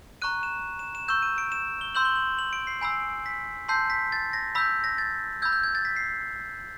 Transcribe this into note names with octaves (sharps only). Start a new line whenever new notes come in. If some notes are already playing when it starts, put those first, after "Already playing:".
A#5 C#6 F#6 D#7
E7
E7
E7
C#6 E6 G6 E7
D#7
D7
E7
G7
C6 E6 G6 F#7
G7
F#7
F#7
D7
C7
G#5 B5 E6 C7
B6
A5 C6 E6 G6 C7
B6
A6
A#6
B5 E6 G6 B6
A#6
A6
B5 E6 G6 G#6
G6
G#6
A6
B6
C7